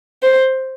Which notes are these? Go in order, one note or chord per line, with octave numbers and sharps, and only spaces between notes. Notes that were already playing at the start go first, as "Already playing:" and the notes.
C5